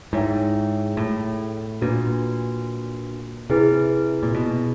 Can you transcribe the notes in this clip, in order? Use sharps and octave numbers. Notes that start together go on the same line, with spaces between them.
G#2 E4 G#4 C#5 E5 G5
A2
A#2 D4 F#4 B4
C3 E4 G#4 B4
A#2
B2